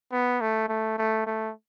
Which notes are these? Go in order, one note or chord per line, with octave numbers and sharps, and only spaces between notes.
B3
A3
A3
A3
A3